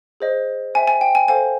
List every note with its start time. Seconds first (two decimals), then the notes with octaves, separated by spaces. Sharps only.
0.20 G#4 C5 D#5
0.74 C5 E5 G5 G#5
0.87 G#5
1.01 G5
1.15 G#5
1.28 A4 C5 F5 G#5